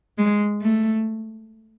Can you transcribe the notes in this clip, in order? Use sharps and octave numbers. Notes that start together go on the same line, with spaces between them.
G#3
A3